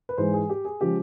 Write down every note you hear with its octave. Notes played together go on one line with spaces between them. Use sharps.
B4
G#2 E3 G#3 C5
G#4
G4
G#4
C#3 F3 G#3 G4